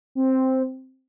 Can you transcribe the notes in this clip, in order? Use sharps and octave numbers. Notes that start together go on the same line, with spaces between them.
C4